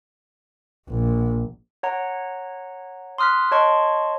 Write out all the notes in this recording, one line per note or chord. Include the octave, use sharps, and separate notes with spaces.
A#1
C#5 F#5 A#5
C6 D#6 F6 F#6 B6
C#5 D#5 A5 C6 C#6